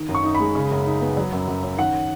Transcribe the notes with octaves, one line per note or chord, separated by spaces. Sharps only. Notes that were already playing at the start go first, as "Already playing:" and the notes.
Already playing: D#3
F#2
C#6
D#4
G#3 B5
C#3
F#2
D#4
B3
F#3
F#2
F#2
C#4
D#3 F#5